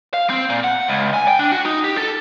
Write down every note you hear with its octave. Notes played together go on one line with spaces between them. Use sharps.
F5
C4
A#2
F#5
C#2
G#5
G5
D4
F#4
D#4
G4
A4